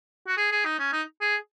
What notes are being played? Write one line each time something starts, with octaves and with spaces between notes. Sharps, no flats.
F#4
G#4
G#4
D#4
C#4
D#4
G#4